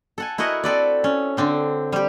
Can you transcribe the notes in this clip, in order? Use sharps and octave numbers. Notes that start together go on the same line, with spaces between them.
A4 F#5 G#5
E4 F#4 A#4 D#5 F#5 G#5
C4 A4 B4 D5
C#4
D3 C4 D4
G3 G4